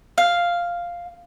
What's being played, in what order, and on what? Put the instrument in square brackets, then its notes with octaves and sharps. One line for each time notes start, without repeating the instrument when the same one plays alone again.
[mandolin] F5